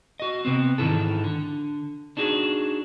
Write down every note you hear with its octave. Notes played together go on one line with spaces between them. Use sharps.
F#4 D#5
C3 B3 C4
G#2 D#3 E3 A4
D3
D4 D#4 F#4 G#4